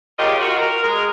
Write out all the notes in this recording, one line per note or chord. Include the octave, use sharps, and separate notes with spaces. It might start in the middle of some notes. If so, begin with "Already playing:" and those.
C#3 F4 G4 A#4 D#5
F4 F#4
A#4
G#3 A#4